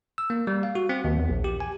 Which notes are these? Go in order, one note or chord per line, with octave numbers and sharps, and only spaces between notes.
E6
A#3
G3
F5
F#4
C4
D#2
E2
A#1
G4
G#5